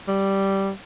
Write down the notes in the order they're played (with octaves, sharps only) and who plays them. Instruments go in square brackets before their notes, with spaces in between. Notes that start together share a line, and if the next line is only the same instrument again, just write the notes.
[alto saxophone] G3